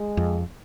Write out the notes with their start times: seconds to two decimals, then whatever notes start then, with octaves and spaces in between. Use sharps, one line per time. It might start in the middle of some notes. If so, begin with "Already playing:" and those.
Already playing: G#3
0.17 F2